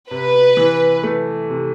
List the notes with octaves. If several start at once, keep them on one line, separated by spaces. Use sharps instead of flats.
C3 B4
E3
A3
C3